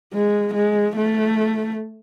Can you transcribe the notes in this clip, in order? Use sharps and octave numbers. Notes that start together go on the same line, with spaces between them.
G#3
G#3
A3